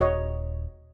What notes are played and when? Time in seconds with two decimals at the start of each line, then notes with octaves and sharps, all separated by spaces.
0.01 D#1 F#4 C#5 D#5